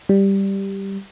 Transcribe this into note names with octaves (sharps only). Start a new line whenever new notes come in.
G3